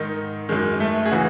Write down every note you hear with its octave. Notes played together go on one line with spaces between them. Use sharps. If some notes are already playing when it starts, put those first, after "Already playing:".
Already playing: G#2 D#3 D#4
F#2 D#3 G#3
A3
G#4
C#3 E3 F#4